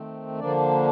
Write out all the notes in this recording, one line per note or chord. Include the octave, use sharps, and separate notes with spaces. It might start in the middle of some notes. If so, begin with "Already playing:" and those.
Already playing: D#3 A3 C4
D3 F3 A#3 D4 D5